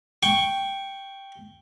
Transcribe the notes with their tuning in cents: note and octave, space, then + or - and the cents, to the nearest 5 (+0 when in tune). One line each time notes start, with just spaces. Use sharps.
G5 +0 C#6 +0